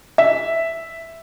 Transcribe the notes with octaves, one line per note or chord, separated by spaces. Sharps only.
E5